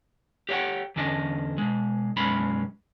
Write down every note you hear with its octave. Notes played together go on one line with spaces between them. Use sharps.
G4 C#5 D#5 F#5 G5
E2 D3 C#4 D4 D#5
B2 G#3
B1 F#2 G#3 C#4 B5